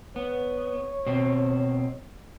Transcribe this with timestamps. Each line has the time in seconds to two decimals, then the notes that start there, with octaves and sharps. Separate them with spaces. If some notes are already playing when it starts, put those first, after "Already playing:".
0.16 B3 C#5
1.07 B2 C4